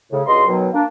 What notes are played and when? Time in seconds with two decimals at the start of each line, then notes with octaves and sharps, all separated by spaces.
0.11 A2 C#3
0.27 C#2 G2 F#3 G#3 D#5 C6
0.47 B2 D#3 F#3
0.73 A#3 D4